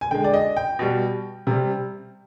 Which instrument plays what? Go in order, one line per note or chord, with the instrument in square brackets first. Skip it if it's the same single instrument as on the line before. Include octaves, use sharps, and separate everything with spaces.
[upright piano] G#5
D3 G#3 G5
D5
D#5
G5
B2 G3
C3 G3